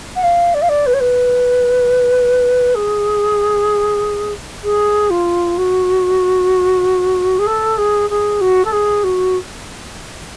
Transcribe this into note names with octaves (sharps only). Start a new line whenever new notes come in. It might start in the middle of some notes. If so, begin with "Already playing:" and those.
F#5
F5
D5
F5
D5
B4
C#5
B4
G#4
G#4
F4
F#4
G#4
A4
G#4
G#4
F#4
A4
G#4
F#4